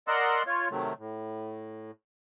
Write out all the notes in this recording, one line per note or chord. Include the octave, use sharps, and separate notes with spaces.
A#4 D5 D#5 F#5 C6 E6
F4 C#5
C3 D#3 F#3 A3
A2